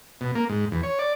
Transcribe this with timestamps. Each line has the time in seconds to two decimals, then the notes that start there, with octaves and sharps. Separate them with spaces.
0.21 B2
0.35 A#3
0.49 G#2
0.72 E2
0.83 C#5
0.99 D5